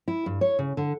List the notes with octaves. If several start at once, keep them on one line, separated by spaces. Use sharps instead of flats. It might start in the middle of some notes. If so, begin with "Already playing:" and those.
E4
G2
C#5
C#3
D3